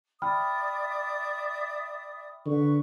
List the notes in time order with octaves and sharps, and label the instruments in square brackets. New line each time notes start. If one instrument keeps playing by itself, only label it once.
[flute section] D5 E5 D#6 [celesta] G5 B5 F6
[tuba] D3 [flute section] B4 C#6